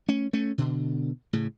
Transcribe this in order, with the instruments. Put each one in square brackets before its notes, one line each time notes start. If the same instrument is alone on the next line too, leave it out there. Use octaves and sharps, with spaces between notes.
[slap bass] A3 C#4
A3 C#4
B2 D3
A2 C#3